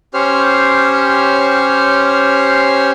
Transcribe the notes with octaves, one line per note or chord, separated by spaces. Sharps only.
C#4 G4 C5 C#5 F6